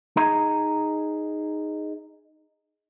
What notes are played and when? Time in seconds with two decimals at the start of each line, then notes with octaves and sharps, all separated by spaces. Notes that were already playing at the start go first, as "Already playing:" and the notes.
0.17 D#4 G#4 D#5 A#5